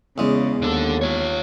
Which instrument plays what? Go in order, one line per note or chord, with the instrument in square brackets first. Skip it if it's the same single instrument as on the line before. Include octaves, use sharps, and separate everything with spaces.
[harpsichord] E2 G#3 [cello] C#3
[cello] D#2 [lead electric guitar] D3 A4
[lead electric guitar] F4 C#5